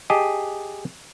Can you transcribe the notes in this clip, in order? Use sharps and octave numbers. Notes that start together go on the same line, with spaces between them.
G4 G#4 D#5 A5